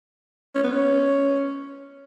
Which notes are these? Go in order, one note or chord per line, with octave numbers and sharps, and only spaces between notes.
C#4
B3
C#4